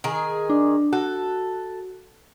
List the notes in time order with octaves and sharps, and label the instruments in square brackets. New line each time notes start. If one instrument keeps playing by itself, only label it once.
[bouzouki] D#3 G#4
[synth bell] D4
[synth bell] F#4 [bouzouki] A4